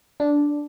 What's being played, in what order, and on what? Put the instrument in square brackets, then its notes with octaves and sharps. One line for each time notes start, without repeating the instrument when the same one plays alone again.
[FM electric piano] D4